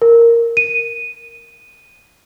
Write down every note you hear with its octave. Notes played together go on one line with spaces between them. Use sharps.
A#4
D#7